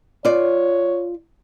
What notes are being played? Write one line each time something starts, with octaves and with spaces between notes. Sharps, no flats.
F4 C#5 D5